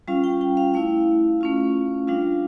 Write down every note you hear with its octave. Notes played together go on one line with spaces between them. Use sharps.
G3 C#4 F4 F5
G5
G5
F5
A3 E4 F5
A3 C#4 F4
G3 D4 F4 F5